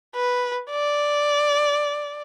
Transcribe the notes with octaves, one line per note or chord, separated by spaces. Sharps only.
B4
D5